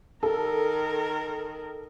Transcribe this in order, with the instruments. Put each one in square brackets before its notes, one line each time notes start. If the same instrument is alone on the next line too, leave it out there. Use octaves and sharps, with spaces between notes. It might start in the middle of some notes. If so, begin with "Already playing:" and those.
[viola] D#3 A#4 [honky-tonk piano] A4